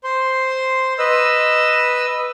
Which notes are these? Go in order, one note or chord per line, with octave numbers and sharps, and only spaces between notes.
C5 C6
B4 D#5 E6